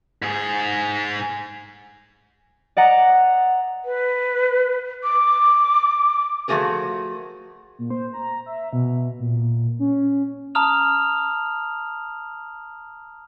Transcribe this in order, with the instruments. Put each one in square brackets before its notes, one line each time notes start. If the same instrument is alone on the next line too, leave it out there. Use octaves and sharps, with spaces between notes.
[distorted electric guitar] G#2 G#4
[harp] D5 D#5 F#5 A#5
[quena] B4
D6
[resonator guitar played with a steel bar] F3 A3 B3 F#4 G#4 A#4
[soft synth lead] A#2
C5
A#5
E5
B2
A#2
C#4
[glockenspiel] A5 A#5 D#6 F6 F7